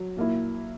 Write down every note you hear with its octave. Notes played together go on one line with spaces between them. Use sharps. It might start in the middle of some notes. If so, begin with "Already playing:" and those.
Already playing: F#3
A#2 A#3 E4